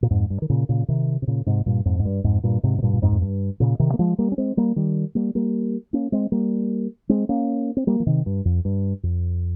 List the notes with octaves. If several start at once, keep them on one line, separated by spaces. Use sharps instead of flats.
A#2
F2 G#2
G2
D#3
A#2 C#3
A#2 C#3
C3 D#3
C3
A#2 C#3
G#2 C3
G2 A#2
F2 G#2
G#2
G2
F2 G#2
G2 A#2
G#2 C3
C3
G2 A#2
A#2
F2 G#2
F2
G2
A#2 C#3
C3 D#3
A#3
F3 G#3
G3 A#3
C#4
G#3 C4
G3 A#3
D#3 G3
G3 A#3
G3 A#3
A#3 C#4
G#3 C4
G3 A#3
G#3 C4
A#3 C#4
C4
G3 A#3
F3
C3 D#3
G2
F2
G2
F2